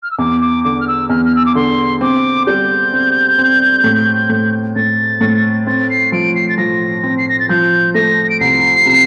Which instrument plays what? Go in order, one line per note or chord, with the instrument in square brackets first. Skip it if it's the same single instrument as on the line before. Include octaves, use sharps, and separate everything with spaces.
[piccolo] F6
E6
[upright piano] E2 [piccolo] D6
[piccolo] D6
[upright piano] D3 [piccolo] D6
[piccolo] F6
E6
[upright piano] E2 [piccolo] F6
[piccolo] F6
E6
D6
[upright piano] D3 [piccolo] C6
[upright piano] C4 [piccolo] D6
[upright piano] G3 [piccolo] G6
[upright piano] C4
C4
A2
A2
[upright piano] A2 [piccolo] A6
[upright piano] A2
[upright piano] C4 [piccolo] A6
[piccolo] C7
[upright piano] F3 [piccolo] D7
[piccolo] C7
A6
[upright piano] F3 [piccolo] A#6
[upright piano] C4
[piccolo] C7
A#6
A6
[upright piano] F3 [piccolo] G6
[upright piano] A3 [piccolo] A#6
[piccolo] D7
[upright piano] C2 [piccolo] C7
[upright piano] C3